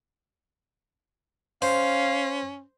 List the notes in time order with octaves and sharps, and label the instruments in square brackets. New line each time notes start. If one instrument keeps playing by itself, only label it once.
[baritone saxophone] C#4 [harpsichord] C5 [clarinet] F5